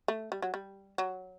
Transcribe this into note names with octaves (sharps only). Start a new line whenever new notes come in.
A3
G3
F#3
G3
F#3